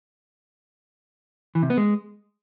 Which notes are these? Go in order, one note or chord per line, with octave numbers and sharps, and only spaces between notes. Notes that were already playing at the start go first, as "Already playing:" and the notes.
E3
C3
B3
G#3